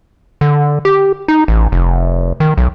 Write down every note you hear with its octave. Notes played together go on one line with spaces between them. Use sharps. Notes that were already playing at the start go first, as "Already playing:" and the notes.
D3
G4
D#4
A1
F1
D#3
B1